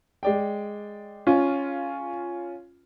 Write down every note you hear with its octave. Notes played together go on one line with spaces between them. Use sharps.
G#3 D5 G5
C#4 F4